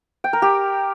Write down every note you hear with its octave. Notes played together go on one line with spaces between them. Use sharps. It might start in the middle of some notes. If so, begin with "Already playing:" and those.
G5
A#4
G4